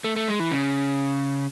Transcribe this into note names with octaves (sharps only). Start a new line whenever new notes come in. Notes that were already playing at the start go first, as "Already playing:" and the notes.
A3
A3
G#3
E3
C#3